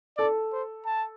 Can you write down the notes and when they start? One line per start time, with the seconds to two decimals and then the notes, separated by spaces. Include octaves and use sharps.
0.18 A4 D5
0.53 C5
0.86 A5